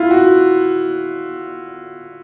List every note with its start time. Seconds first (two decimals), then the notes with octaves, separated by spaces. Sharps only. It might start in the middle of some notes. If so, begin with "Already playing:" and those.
Already playing: E4 F4
0.11 F#4